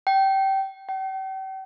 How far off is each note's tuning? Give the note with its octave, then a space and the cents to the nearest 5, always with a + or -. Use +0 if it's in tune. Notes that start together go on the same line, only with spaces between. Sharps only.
G5 -20
G5 -40